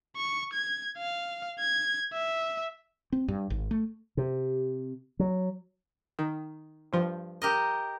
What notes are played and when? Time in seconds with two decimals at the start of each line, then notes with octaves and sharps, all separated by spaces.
0.17 C#6
0.53 G#6
0.98 F5
1.60 G#6
2.13 E5
3.12 C4
3.28 G2
3.50 G#1
3.71 A3
4.17 C3
5.19 F#3
6.19 D#3
6.93 G2 F3
7.42 G4 A#4 D#5